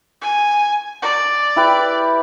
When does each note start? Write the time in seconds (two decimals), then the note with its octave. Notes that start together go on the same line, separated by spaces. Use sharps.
0.22 G#5
1.02 D5
1.56 E4 G4 B4